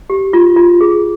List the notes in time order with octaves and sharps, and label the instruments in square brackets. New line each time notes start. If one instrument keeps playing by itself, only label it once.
[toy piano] G4
F4
F4
G#4